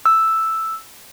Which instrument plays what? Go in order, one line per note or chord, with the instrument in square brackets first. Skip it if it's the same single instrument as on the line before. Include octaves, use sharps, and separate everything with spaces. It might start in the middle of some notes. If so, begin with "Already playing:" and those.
[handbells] E6